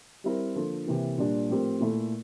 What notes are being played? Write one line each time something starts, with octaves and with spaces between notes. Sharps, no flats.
G3 C4 E4 A#4
D3 F3 A#3 F4 A4
C3 E3 A#3
A#2 G3 D4 F4
A2 F3 C4 G4 A#4
A#2 A3 E4 A4